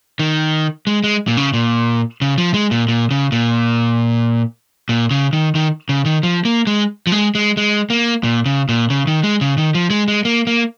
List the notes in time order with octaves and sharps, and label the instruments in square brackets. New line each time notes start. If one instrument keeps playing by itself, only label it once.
[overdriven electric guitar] D#3
G#3
G#3
A#2
C#3
A#2
C#3
F3
G#3
A#2
A#2
C#3
A#2
A#2
C#3
D#3
D#3
C#3
D#3
F3
A#3
G#3
F3
G#3
G#3
G#3
A#3
A#2
C#3
A#2
C#3
D#3
G#3
C#3
D#3
F3
G#3
G#3
A#3
A#3